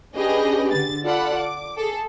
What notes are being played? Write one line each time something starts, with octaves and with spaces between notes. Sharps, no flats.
C#4 D4 G4 G#4 B4 D#5
D3 A6
F4 A4 D5 F#5 B5
D6
G#4 A4